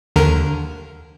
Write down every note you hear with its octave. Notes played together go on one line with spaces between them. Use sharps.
D#2 D3 A#4